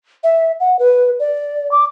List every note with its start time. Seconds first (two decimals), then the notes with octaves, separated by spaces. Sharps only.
0.24 E5
0.60 F#5
0.79 B4
1.19 D5
1.71 D6